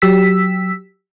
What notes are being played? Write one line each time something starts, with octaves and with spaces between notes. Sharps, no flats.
F#3 G4 E6 B6